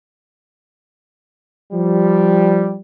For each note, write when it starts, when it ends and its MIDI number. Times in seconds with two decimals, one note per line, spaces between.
1.73 2.79 53
1.73 2.79 55